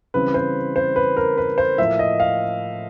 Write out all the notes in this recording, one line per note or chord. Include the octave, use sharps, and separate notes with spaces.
C#3 E3 G3 C4 B4
C5
C5
B4
A#4
B4
C5
A2 F3 A#3 E5
D#5
F5